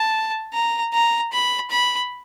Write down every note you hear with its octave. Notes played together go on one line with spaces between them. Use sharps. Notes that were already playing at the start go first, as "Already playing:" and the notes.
Already playing: A5
A#5
A#5
B5
B5